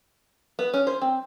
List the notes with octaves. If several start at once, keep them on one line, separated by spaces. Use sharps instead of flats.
B3
C#4
C5
C4